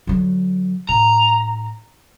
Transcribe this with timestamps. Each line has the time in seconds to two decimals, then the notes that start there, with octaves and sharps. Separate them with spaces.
0.07 D3 F#3
0.89 A2 A#5